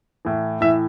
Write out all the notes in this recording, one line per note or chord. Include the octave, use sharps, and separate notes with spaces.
A2 E3
A2 E3 E5